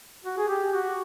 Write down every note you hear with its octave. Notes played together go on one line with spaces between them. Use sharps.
F#4
G#4
G4
F#4